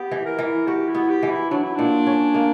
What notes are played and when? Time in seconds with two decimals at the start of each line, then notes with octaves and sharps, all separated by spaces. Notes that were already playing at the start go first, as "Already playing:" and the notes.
Already playing: B3 G4
0.11 E3
0.25 A#4
0.39 E3
0.67 F#4 G4
0.88 E4
0.94 B3
1.09 G4
1.23 E3
1.30 E4
1.50 F#3 D4
1.63 E4
1.75 A#2 D4
2.07 C#4
2.34 A#3